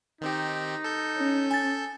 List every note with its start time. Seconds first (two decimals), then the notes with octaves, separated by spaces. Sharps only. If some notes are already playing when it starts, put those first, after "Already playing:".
0.21 D#3 C4 D#4 G4
0.84 A4 G6
1.19 C#4
1.51 G#5 A6